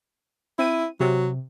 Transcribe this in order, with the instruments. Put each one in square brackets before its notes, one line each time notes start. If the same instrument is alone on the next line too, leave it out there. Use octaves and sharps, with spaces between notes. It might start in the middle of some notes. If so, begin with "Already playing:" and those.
[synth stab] C4 D#7 [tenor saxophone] E4
[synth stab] C3 [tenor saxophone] F#3